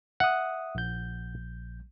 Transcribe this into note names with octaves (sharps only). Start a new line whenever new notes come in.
E5 F#5 D#6
A#1 G6